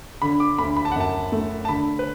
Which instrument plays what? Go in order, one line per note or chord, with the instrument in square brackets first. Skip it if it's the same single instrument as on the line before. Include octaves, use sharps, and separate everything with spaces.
[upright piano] D3 [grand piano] B5
[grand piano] D6
[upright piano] D2 [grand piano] B5
[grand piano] B5
A5
F#5
[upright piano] F#2 [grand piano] A5
[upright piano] A3
[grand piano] A5
[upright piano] D3 [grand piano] B5
[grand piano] B4